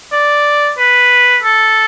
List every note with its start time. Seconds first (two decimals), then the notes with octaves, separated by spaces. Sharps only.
0.12 D5
0.78 B4
1.43 A4